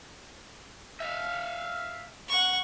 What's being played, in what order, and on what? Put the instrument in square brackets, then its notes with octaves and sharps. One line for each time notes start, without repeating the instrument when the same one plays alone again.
[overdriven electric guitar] E5 F5
[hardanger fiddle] F#5 C#6